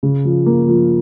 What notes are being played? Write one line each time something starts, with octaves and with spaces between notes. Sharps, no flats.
C#3
F3
A#3
F3